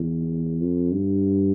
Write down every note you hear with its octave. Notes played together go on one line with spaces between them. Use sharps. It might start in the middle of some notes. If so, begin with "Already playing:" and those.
Already playing: E2
F2
G2